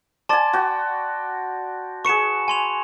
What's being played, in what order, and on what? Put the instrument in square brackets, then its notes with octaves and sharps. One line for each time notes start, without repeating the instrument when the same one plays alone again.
[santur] D5 G#5 [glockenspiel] A5 C6 A6
[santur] F#4 G5
[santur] G#4 B4 [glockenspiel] C#6 C#7 E7
[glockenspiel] G#5 C6 F7